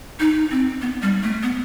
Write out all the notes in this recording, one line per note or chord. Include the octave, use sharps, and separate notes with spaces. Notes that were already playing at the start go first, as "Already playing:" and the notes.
D#4
C4
B3
G3
A3
B3